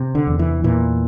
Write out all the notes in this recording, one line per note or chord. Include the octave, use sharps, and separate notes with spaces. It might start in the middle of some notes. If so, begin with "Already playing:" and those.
Already playing: C3
D3
E2
E3
A#2 E3